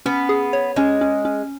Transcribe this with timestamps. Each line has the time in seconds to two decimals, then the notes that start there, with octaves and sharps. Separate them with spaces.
0.06 B3 C#4
0.29 G#4
0.53 C#5
0.76 G#3 C#4
1.01 C#4
1.25 C#4